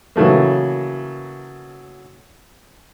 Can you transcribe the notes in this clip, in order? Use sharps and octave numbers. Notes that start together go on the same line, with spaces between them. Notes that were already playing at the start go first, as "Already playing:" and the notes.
C#3 E3 F#3 A3 A#3